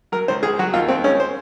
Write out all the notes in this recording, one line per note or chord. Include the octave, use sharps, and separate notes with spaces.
F#3 A#4
C#2 C5
C#2 G#4
F#3 F#4
D#2 F4
D#2 C4
G#3 C#4
C5